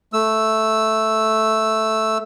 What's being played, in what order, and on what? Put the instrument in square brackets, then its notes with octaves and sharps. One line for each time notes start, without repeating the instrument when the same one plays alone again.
[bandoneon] A3 E6